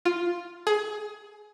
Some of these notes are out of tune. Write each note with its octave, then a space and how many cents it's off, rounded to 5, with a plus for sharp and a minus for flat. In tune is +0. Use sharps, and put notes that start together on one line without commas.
F4 +0
G#4 +20